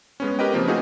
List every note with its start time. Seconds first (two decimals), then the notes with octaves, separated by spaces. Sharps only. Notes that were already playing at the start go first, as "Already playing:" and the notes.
0.20 G#3 B3 C#4
0.39 G4 A#4 B4 D#5 G5
0.53 C#3 F3 A#3 C4
0.68 A3 C#4 D#4 F4 F#4 G#4